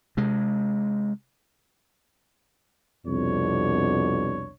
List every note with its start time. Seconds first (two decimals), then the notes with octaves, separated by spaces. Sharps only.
0.17 C3 G#3
3.07 C2 F2 B2 D4 C#5